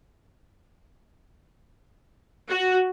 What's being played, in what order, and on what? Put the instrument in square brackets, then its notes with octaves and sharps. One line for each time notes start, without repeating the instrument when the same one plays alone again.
[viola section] F#4